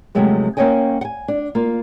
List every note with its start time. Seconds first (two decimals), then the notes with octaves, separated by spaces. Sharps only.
0.15 C3 F3 F#3 G#3 A3 B3
0.57 A#3 C#4 C#5 D#5 G5 G#5
1.01 F#5 G#5
1.28 D4
1.55 A#3 F4